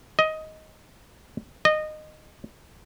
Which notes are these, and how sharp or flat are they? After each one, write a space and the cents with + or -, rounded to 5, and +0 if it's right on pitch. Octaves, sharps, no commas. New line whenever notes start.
D#5 +10
D#5 -20